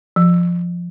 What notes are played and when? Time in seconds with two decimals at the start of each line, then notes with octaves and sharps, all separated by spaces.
0.16 F3